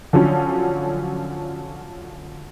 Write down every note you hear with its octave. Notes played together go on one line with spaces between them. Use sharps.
D3 F3 F#3 C#4